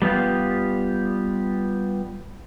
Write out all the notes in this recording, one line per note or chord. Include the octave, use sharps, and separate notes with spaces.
G3 B3 F4 G4